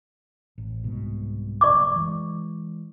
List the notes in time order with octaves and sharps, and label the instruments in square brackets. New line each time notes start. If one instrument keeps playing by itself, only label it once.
[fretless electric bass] A1
C2 G#2 B2
[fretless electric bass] F#1 F#2 [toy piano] D5 C#6 D6
[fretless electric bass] E3 G#3